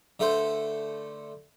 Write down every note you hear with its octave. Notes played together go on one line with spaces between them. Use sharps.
D3 A3 B4 C5